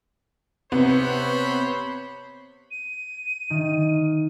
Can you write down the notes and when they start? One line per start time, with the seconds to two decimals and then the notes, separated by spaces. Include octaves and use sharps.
0.72 C3 B3 C5 C#5 B5
2.71 D#7
3.50 D#3